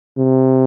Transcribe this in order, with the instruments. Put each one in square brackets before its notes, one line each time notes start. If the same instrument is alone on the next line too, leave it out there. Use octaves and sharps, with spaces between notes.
[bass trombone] C3